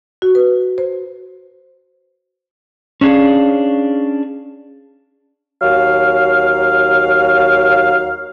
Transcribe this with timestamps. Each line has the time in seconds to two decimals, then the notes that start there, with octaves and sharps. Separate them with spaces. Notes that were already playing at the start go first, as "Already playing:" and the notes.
0.22 F#4
0.35 B4
0.78 C5
3.01 C#4 D4 G#4 C#5 F5
5.62 D#2 F#3 F5